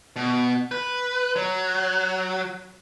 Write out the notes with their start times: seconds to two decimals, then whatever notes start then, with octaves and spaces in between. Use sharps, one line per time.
0.16 B2
0.71 B4
1.36 F#3